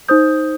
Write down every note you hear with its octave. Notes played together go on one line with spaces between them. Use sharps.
D#4 C5 D#6 G6